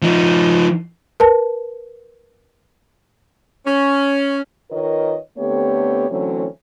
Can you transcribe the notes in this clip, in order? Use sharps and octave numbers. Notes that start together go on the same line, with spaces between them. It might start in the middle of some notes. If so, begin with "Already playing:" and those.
F3 D#4
A#4 B4 A5
C#4
D#3 F4 A#4 B4 C#5 D#5
D3 A3 B3 C4 G4 C#5
D3 E3 F#3 A3 C4 C#4